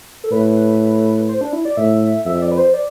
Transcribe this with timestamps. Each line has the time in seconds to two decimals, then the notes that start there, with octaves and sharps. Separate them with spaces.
0.24 A4
0.31 A2 B4
1.29 C5
1.41 D4
1.53 E4
1.65 D5
1.77 A2 E5
2.25 F2 E5
2.42 D5
2.52 B4
2.57 C5
2.74 D5